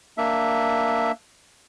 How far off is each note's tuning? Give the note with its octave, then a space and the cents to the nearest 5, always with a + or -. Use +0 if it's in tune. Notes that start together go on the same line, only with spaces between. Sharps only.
A#3 -5 D4 +0 E5 +0